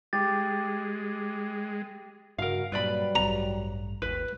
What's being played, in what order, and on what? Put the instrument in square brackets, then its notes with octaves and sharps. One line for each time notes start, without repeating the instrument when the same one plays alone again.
[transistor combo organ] G#3 [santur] G4 [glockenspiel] A6
[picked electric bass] G2 C#3 [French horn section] F#4 [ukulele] A#4 F5
[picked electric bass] G2 A#2 [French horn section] F#3 G3 [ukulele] B4 D5 B5
[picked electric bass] A1 G2 [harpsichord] A#5
[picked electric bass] G#1 D#2 [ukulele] B4